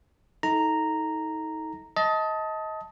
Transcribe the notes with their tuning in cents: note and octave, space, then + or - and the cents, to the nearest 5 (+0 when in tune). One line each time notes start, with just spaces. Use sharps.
D#4 +35 A4 -15 A#5 -5
D#5 +25 A5 +0